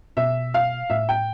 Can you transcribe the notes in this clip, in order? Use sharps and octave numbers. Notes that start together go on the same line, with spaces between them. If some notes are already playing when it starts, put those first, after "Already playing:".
B2 E5
F5
A2 E5
G5